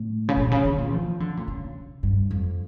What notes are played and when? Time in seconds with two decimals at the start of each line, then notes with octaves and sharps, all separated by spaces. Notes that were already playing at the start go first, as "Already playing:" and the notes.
Already playing: A2
0.29 C#3
0.37 A#2
0.51 C#3
0.65 D3
0.78 A#2
0.92 F3
1.20 D3
1.37 A#2
1.48 C#3
2.03 G2
2.31 F2